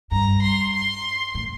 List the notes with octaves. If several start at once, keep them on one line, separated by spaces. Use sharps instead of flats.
G2 A#5
C6
C6
A2